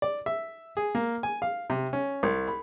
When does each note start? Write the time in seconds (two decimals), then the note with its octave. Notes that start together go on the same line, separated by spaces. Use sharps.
0.02 D5
0.26 E5
0.77 G#4
0.95 A#3
1.23 G#5
1.42 F5
1.70 C3
1.93 C#4
2.23 C2
2.48 B5